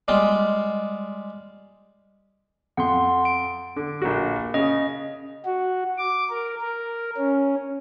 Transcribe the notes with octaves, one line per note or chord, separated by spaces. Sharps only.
G3 G#3 F4
F2 F#5 C6
D7
D3
A#1 A#3 F#4
C#3 D#5
F#4
D6
A#4
A#4
C#4